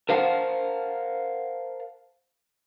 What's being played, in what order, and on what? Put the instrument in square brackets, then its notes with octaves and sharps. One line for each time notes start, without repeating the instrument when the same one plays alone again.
[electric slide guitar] A#4 C5 F5 F#5 A5